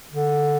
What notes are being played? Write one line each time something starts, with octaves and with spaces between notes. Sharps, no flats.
D3